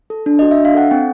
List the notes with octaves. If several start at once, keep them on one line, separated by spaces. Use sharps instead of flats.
A4
D4
F#4 D#5
E5
D4
F5
A4 F#5
C4 G5